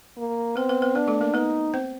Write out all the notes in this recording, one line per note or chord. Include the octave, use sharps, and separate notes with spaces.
A#3
B3 C4 B4
B3 B4
B3 B4
B3 D4 B4
A3 A4
A#3 A#4
B3 D#4 B4
C4 C5